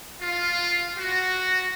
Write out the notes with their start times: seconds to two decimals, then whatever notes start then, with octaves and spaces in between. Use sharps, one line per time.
0.21 F4
0.97 F#4